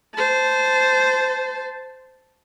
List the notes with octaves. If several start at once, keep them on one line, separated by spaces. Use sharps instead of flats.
C5 A5